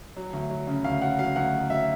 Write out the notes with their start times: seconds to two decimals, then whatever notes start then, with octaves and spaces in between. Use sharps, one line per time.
0.16 F#3
0.33 D2
0.50 F#3
0.67 C#3
0.84 D2 F5
1.01 F#3 F#5
1.19 F#3 F5
1.36 D2 F#5
1.53 F#3
1.70 F#3 E5